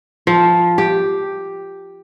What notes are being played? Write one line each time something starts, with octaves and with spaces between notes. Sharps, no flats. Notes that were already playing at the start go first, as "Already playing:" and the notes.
F3
G4